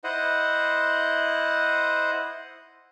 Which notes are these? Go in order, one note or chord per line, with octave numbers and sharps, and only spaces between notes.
E4 C5 D#5 F#5